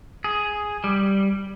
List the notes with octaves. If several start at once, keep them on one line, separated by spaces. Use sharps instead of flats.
G#4
G3